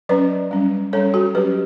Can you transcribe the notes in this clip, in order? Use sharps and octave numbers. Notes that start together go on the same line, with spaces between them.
F#3 C#4 B4 D5
G3 C#4
G3 C#4 A4 C#5
F#4 A4
F#3 C#4 G4 B4